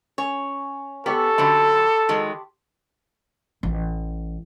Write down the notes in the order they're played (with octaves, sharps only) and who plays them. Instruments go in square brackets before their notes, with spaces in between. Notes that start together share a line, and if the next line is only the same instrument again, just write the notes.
[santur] C#4 [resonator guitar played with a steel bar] C#5
[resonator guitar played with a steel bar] B3 [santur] G4 C#6 E6 [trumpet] A4
[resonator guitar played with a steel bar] F#2 D3 F#3 [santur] A5 B5 C6
[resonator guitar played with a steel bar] D#3 F#3 G#3
[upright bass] A1